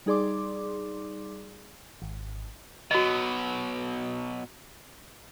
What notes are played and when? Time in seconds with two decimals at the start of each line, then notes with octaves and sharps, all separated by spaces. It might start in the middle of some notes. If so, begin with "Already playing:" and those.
0.06 G3 D#4 G#4 D5 C6 D6
2.02 G#1
2.91 B2 F#3 F#4 D#5